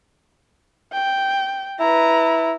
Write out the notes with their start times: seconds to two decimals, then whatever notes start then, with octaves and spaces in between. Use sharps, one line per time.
0.93 G5
1.80 E4 B4 A#5